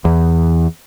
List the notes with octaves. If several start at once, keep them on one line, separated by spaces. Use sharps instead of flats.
E2